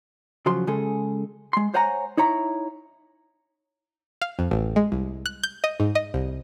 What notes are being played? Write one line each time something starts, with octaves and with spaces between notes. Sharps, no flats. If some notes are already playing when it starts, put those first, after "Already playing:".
C#3 F3 F#3 C6
C#3 G#3 G#4 A4
G#3 C6
C5 C#5 F#5 G#5 A#5
D#4 E4 C#5 A#5 B5
F5
F2
A1
G#3
C2
F#6
G6
D#5
G#2
D#5
C2